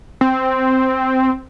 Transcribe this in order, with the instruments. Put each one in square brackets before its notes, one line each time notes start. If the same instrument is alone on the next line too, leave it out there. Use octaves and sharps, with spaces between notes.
[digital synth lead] C4